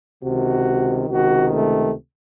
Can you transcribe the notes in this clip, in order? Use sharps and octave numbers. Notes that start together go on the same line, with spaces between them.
C#2 C3 D#3 F#4
C#2 C3 D#3 F#4
A3